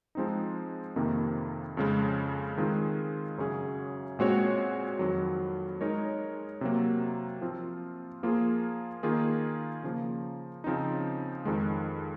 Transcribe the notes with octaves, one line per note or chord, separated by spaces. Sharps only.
F3 G#3 C4 D#4
F2 C3 D#3 A#3
F2 C#3 G#3
D#3 G#3 C4 F4 G#4
F#2 C#3 F#3 C#4 G#4
A#2 G#3 C4 F#4 C#5
F2 D#3 F#3
G#3 D#4 A#4 C#5
C3 F#3 A#3
F3 C4 F4
F3 A#3 F4 G#4
D#3 A#3 F4 G#4
C#3 F3 A#3
C#3 F3 C4 D#4
F2 D#3 G#3